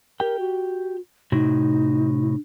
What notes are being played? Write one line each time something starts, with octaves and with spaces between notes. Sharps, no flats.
G4 A#4 G5
F#4
A2 C3 D#4 F#4